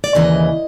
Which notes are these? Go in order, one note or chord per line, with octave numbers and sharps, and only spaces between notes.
D5
D#2 C#3 E3 D#5